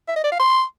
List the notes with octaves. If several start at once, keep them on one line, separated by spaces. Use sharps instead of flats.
E5
D#5
D5
F5
C6